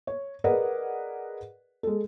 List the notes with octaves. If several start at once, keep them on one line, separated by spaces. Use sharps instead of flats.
C#5
G#4 A#4 B4 D5 D#5 F#5
G#3 A4